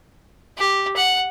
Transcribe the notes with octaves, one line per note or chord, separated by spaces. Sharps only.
G4
F#5